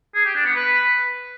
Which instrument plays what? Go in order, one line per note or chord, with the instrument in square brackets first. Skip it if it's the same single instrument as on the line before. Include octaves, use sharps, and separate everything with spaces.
[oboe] G#4
G4
D4
B3
B4